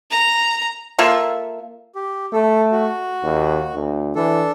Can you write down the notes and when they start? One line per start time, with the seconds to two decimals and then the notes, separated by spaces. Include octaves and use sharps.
0.11 A#5
0.99 A#3 F4 A4 E5
1.95 G4
2.33 A3 A4
2.72 F#4
3.23 D#2
3.74 D2
4.15 E3 D4 A4